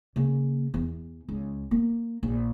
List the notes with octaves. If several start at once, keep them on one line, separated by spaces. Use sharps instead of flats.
C#3 A#3
E2 E3
C#2
A#3
A#1